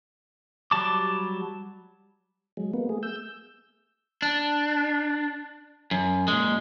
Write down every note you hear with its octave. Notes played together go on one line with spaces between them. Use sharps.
F#3 G3 A5 D6
F#3 G#3
A#3 B3
A3 G#4
E6 G6
D4
F#2
A#2 G#3